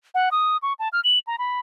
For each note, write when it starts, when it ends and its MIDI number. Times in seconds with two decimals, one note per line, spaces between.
0.15 0.29 78
0.31 0.57 87
0.63 0.73 85
0.79 0.89 81
0.93 1.00 89
1.04 1.19 102
1.27 1.36 82
1.38 1.60 83